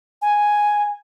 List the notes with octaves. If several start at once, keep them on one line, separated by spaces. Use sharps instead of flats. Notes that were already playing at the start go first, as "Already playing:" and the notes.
G#5